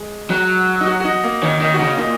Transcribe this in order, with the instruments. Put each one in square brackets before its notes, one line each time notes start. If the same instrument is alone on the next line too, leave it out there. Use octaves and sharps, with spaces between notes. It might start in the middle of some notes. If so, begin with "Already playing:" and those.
Already playing: [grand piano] G#3
[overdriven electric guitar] F#3
[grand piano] D#4
F#4
F#4
D#4
A#3
[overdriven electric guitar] D#3 [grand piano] C#4
[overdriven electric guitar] D#3 [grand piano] D#4
[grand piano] F#4
[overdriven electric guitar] C#3 [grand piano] D#4
[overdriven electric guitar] A#2 [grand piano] D#4